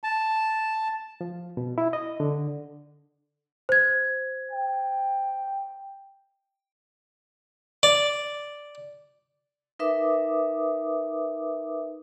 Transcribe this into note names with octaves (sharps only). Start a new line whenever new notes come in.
A5
F3
B2
E4
D#5
D3
C5 G#6
G5
D5
D#4 A#4 B4 E5 D6 D#6